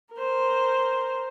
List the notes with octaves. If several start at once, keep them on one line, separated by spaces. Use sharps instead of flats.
A#4 C5